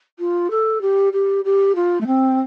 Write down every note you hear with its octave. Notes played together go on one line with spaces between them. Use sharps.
F4
A4
G4
G4
G4
F4
A3
C4